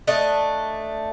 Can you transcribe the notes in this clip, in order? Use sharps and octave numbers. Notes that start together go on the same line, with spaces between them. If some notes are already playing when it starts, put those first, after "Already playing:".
A3 D4 D#5